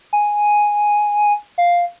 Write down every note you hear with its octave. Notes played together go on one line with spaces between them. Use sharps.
G#5
F5